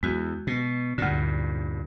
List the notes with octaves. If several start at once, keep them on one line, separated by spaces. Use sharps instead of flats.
E2 G#3 F#4
B2
D2 G2 A#2 D3